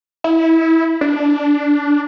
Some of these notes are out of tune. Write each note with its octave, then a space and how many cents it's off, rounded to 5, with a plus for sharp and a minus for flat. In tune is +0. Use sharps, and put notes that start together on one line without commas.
E4 -20
D4 -5